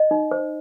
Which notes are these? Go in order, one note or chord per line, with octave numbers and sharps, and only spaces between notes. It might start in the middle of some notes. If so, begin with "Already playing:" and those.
Already playing: D#5
D#4
C5